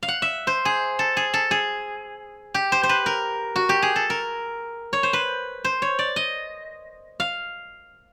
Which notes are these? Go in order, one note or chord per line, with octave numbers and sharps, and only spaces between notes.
F5
F#5
E5
C5
G#4
A4
G#4
A4
G#4
G4
C5
C5
B4
A#4
F#4
G4
G#4
A4
A#4
C#5
C5
B4
C5
C#5
D5
D#5
F5